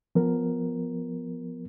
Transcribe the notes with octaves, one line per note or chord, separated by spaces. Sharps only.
F3 B3 A#4